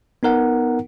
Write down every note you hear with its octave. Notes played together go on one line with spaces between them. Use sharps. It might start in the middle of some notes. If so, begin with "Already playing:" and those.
B3 D#4 A#4 F#5